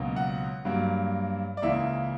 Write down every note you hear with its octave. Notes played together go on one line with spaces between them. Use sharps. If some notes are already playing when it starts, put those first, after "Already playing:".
Already playing: C#2 B2 F#3 A#3
F#5
G2 F#3 A#3
D5
C#2 C#3 E3 A#3 E5